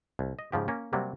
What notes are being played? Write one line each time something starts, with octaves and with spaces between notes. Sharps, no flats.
C2
D#5
G#2 C#3 F3 G4
A#3 C#4
C3 F#3 G3 A#3